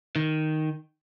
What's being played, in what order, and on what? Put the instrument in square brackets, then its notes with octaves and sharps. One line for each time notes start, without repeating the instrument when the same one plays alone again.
[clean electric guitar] D#3